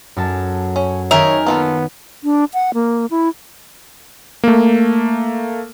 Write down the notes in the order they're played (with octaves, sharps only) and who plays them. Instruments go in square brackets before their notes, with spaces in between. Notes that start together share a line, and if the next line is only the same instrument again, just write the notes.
[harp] F#2 A4 A5
[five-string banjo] C#4
[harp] D#3 G#5 G6 [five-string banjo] G#4 E5 [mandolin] A#4 [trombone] C#5
[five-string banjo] A#3 F4 A4 [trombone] B3
[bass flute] D4
F#5
A#3
E4
[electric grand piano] A3 A#3